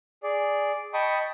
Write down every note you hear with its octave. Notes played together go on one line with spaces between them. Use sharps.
G#4 D5
D#5 G5 A5 B5 C#6 D#6